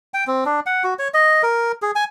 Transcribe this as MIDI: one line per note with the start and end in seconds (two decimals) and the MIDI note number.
0.14 0.24 79
0.27 0.44 60
0.45 0.60 62
0.66 0.83 78
0.84 0.94 66
0.99 1.08 73
1.14 1.42 75
1.43 1.72 70
1.82 1.91 68
1.95 2.04 80